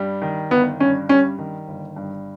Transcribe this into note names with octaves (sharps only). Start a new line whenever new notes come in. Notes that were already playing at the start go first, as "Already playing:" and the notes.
Already playing: G2 G3
D#3
G1 B3
G2 C#4
G3 C#4
D#3
G1
G2